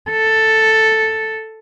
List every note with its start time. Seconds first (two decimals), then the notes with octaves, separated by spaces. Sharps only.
0.11 A4